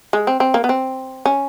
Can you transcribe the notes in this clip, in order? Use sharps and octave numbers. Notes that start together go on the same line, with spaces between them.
G#3
C4
C4
A#3
B3
C4
C#4